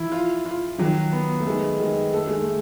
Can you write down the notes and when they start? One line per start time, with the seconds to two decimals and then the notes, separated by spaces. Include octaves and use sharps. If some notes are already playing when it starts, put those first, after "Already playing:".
Already playing: E3 F3 E4
0.12 F4
0.45 F4
0.78 D#3 F#3
1.12 B3
1.40 A3
1.47 D#3 G#3
1.79 D#3 G#3
2.13 A3 A4
2.27 G#3
2.41 A3